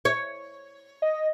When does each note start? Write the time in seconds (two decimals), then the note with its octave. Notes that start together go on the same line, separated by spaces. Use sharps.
0.05 C#5
1.02 D#5